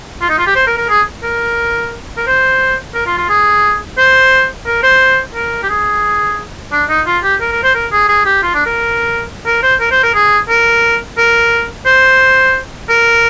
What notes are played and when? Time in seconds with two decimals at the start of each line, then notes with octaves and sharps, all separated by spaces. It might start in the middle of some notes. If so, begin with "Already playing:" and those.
0.21 F4
0.29 D#4
0.38 F4
0.47 G4
0.55 C5
0.67 A#4
0.77 A#4
0.89 G#4
1.23 A#4
2.17 A#4
2.27 C5
2.94 A#4
3.06 F4
3.18 F4
3.29 G#4
3.98 C5
4.66 A#4
4.83 C5
5.35 A#4
5.63 G4
5.69 G#4
6.72 D4
6.89 D#4
7.06 F4
7.23 G4
7.41 A#4
7.52 A#4
7.63 C5
7.75 A#4
7.92 G#4
8.09 G#4
8.26 G4
8.43 F4
8.54 D4
8.66 A#4
9.46 A#4
9.63 C5
9.80 A#4
9.91 C5
10.03 A#4
10.14 G#4
10.49 A#4
11.18 A#4
11.86 C5
12.89 A#4